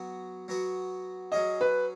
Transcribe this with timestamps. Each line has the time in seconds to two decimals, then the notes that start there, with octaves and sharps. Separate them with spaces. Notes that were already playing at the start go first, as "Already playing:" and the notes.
Already playing: F#3 B3 F#4
0.48 F#3 B3 F#4
1.32 F#3 C#4 G#4 D#5
1.61 B4